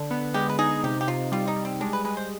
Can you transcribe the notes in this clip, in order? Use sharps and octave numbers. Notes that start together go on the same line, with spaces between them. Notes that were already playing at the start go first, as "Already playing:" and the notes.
Already playing: D3
B3
G#3 G4
B4
D#4 G#4
C3 G4
G4
C3 F4
G3 F4
D#4
G3
C4
G#3 D4
B4
G#3 B4
C5